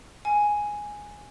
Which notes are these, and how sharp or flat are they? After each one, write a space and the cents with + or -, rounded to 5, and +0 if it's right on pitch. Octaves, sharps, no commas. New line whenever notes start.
G#5 +0